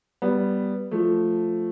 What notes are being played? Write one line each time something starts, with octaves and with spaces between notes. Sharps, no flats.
G3 B3
F3 A3